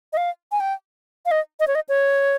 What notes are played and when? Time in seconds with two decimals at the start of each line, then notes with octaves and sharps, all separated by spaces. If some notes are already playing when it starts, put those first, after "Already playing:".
0.13 D#5
0.17 F5
0.52 G#5
0.60 G5
1.26 F5
1.31 D#5
1.60 D#5
1.67 C#5
1.75 D#5
1.89 C#5